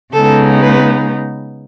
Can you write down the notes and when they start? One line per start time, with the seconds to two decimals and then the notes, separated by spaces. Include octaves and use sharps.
0.14 C#3 G#3 B3 D#4 A4
0.62 B4